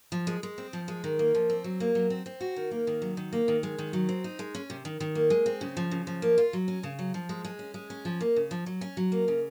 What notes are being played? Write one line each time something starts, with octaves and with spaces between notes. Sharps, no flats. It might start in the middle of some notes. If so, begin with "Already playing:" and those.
F3
G#3
G#3
C4
F3
G#3
D#3
A#3
F3
C4
F#3
A#3
F#3
C4
C4
F#4
D#3
A#3
D#3
F#3
D#3
A#3
D#3
G#3
D#3
F#3
C4
D#4
G#3
C#4
C3
D#3
D#3
A#3
G#3
C4
C#3
F3
C#3
F3
A#3
F4
F#3
C#4
C#3
F#3
F3
G#3
G#3
C#4
G#3
C#4
F3
A#3
C#3
F3
F#3
C#4
F#3
A#3
C#3